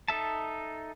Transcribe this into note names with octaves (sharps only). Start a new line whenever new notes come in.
D#4 A4 E5 A5